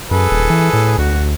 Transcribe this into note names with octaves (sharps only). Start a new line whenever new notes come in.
F#2 G#4 A4 B4
D#1
E3
A2
D2 F#4